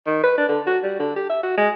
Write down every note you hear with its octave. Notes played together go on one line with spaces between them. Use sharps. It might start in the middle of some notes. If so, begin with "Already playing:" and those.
D#3
B4
D4
D3
F#4
G3
D3
G4
E5
F#4
G#3